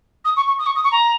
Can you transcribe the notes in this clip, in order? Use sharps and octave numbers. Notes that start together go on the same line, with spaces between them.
D#6
C#6
C#6
D#6
C#6
D#6
C#6
A#5